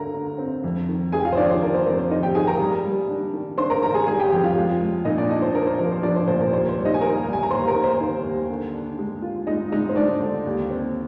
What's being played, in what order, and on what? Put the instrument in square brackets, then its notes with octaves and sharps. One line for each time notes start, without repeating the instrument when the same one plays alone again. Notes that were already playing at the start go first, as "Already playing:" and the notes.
Already playing: [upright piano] D2 D3 A#4 A#5
D3
C4
F2
D#3
F2 G#4 G#5
G5
F4 F5
C5
D#3 D4 D5
C5
D#3 A#4
C5
F2 A#4
C5
D#3 D#4 D#5
G4 G5
D#3 G#4 G#5
A#4 A#5
G3
G3
D4
D#3
D4 C5 C6
A#4 A#5
D#3 A#4 A#5
G#4 G#5
G3 G#4 G#5
G4 G5
F2 G4 G5
F4 F5
G#3
G#3
A#2 D#4 D#5
D4 D5
D4 D#4 D#5
C5
D4 A#4
C5
F3 A#4
C5
F3 D4 D5
C5
A#2 C5
A#4
D#2 C5
C5
G3
D#4 D#5
G#5
D#2 A#4 A#5
G3
G#5
A#5
D#2 C5 C6
A#4 A#5
D#3
C5
D#3 C5
D#2
D3
D4
G#3
F4
G#3 D#4 D#5
G#3 D#4 D#5
C5
G#3 D4 D5
D3
D#2
C4